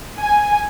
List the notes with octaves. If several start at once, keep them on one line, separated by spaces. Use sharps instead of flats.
G#5